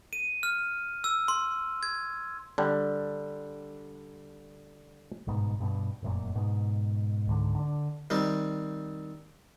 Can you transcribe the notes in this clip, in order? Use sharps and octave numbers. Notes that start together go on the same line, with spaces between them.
D#7
F6
E6
C6
G#6
D3 G3
G1 G#2 B2
G2 B2
F1 F#2 A#2
G#2 B2
C#2 G#2 D3
D3 D4
D#3 G3 C4